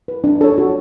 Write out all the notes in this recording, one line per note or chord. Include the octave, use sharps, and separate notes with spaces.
B4
D4
A4 C#5
F#4